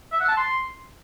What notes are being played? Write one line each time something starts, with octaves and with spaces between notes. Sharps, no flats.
E5
F#5
A5
C6